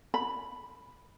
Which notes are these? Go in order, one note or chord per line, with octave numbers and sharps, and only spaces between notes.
B5